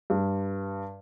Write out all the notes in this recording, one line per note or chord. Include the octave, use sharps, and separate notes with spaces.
G2